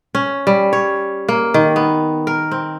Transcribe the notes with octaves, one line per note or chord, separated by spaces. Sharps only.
C#4
G3
C#5
A#3
D#3
B3
A#4
C4